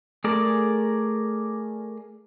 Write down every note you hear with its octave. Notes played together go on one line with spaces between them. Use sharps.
A3 G#4 A#4 D5